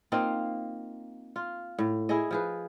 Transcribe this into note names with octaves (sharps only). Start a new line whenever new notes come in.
A#3 C4 D#4 F4
F4
A2
E4 G#4 D#5
F3 G#4 B4